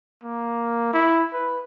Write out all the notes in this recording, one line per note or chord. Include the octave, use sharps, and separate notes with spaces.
A#3
E4
B4